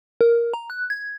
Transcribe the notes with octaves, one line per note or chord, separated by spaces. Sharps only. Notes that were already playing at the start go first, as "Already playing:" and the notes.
A#4
A#5
F#6
G#6